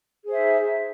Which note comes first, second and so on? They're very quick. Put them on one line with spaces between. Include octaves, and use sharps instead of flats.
G#4 C5 E5 D#4